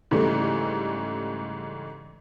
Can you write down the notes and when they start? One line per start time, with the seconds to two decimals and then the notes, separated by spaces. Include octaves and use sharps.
0.11 G#2 C#3 E3 G3 A3